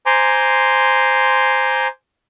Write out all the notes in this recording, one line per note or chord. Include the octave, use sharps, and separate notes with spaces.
C5 G#5 A#5 C6 D6